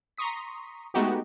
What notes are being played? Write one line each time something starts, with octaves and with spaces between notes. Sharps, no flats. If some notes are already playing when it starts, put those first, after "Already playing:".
A#5 C6 C#6 D#6 B6
G#3 A3 B3 D#4 F#4 G4